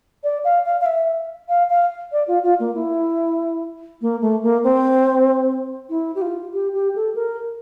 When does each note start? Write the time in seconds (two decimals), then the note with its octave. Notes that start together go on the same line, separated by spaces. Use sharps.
0.24 D5
0.44 F5
0.66 F5
0.81 F5
0.86 E5
1.49 F5
1.70 F5
2.12 D5
2.28 F4
2.43 F4
2.60 A#3
2.75 E4
4.01 A#3
4.21 A3
4.43 A#3
4.64 C4
5.90 E4
6.15 G4
6.21 F4
6.53 G4
6.74 G4
6.96 A4
7.15 A#4